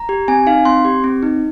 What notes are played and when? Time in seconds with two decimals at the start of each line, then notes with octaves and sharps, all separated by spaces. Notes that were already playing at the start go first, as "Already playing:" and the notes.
Already playing: A#5
0.09 G4
0.28 C4 G#5
0.47 D#4 F5
0.65 C4 C6
0.85 G4
1.04 C4
1.23 D#4